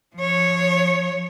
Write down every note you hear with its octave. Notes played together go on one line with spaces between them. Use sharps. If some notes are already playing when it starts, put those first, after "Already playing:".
F3 C#5